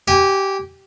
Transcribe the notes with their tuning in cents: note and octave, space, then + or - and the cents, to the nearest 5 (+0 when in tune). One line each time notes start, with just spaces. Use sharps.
G4 -15 G#5 -35